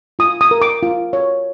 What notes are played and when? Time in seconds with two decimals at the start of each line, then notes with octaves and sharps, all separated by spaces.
0.19 F4 D#6
0.41 D#6
0.51 A#4
0.62 D6
0.83 F4
1.13 C#5